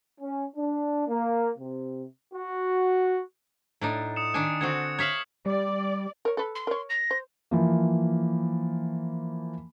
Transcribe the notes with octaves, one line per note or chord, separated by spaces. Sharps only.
C#4
D4
A#3
C3
F#4
A2 D4 D#4
D#6 C#7 E7
D#3 D4 G#5
D3 C4 F#4 G#6 C#7
C#5 E5 F5 G#6 B6 F#7
G3 D5
A#4 C#5
A4 B4
C6
A#4 C#5
A#6
C5
E3 F3 A#3